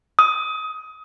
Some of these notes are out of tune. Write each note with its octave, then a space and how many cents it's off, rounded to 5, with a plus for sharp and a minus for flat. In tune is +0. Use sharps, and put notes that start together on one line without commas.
D#6 +25